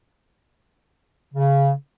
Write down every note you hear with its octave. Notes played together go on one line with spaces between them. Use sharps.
C#3